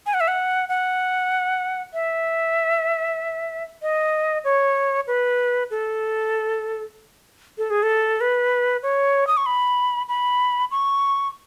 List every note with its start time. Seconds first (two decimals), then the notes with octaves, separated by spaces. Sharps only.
0.06 G#5
0.14 F#5
0.20 E5
0.28 F#5
0.69 F#5
1.94 E5
3.82 D#5
4.44 C#5
5.07 B4
5.70 A4
7.58 A4
7.70 G#4
7.83 A4
8.21 B4
8.83 C#5
9.27 D#6
9.37 C#6
9.46 B5
10.09 B5
10.71 C#6